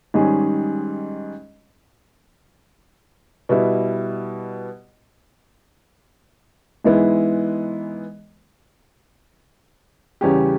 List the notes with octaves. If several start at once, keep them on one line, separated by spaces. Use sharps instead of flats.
G#2 D#3 G3 C#4 G#4
B2 G3 B3 E4
G#2 E3 G#3 B3 E4
E2 C#3 G3 C#4 G4